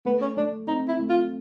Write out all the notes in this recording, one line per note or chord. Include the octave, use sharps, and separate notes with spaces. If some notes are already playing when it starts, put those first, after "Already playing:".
A3 B3
C#4
A3 D4
C4 D#4
E4
A3
F4